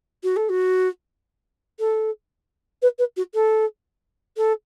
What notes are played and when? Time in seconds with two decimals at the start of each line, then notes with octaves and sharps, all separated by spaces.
0.23 F#4
0.36 A4
0.49 F#4
1.79 A4
2.82 B4
2.98 B4
3.17 F#4
3.34 A4
4.37 A4